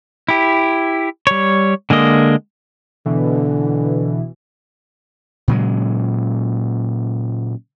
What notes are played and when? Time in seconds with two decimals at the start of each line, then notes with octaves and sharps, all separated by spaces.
0.29 E4 G4
1.27 G3 C#5
1.90 D3 G#3 A#3 D#5
3.06 B2 D3 E3
5.48 A#2 C#3 F#3 G#3